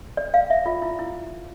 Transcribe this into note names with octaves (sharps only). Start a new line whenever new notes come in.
D5
F5
E5
F4
E4
E4